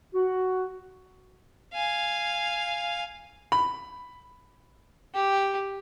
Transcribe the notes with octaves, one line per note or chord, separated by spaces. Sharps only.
F#4
F5 G#5
B5
G4